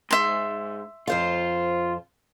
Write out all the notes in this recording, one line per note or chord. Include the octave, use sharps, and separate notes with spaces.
G#2 E5 C6
F2 F4 C5 F5